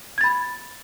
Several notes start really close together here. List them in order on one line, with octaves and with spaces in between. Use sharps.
G#6 A6 B5